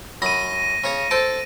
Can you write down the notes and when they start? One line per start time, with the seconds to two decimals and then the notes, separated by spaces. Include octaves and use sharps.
0.22 F#2 B5 D#6 A#6 D#7
0.84 C#3 C#5 D#6
1.11 A4 C5 A5 D7